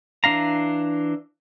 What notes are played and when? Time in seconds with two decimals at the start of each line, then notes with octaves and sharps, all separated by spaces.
0.24 E3 D4 F5 A#5